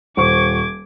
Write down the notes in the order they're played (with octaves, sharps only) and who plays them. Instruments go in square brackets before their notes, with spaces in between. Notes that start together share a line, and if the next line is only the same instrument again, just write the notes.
[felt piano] D#1 C5 C#6 [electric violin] D6 G#6